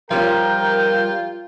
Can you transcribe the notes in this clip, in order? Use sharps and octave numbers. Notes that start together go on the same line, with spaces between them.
F3 G3 C#4 F4 A#4 G5